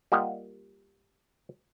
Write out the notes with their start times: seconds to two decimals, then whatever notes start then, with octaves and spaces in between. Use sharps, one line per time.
0.12 G3 A#3 F4 G4 D#5 F#5